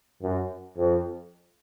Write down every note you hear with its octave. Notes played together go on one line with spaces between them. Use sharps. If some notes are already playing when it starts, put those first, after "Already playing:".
F#2
F2